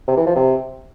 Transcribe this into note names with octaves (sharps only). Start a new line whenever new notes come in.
C3
E3
F3
C3